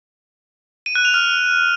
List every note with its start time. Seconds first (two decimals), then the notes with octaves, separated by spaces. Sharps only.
0.86 D#7
0.95 F#6
1.05 F7
1.14 F6